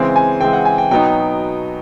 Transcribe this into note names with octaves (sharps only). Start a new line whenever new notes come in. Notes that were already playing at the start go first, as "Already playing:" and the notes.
Already playing: C#3 E3 G#3 C4
G#5
C#3 E3 G#3 C4 G5
F#5
G#5
G5
B2 F#3 B3 D#4 G5